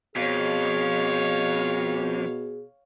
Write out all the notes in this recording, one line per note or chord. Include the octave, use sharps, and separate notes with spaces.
F2 B2 G#4 C#5 F5